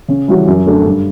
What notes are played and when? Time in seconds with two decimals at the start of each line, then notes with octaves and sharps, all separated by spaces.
0.08 C#3
0.28 E3 G3 C#4 F#4
0.47 F#2
0.66 D3 F#3 A3 D4
0.85 G2